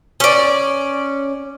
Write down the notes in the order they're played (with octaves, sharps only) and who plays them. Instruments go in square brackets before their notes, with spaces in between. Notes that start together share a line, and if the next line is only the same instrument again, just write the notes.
[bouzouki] C#4 D5